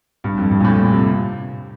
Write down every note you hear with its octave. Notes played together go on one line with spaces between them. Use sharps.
G2
F2
G2
A#2
A2
A#2
C3